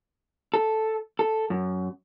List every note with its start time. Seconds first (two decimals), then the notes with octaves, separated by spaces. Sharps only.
0.54 A4
1.19 A4
1.50 F#2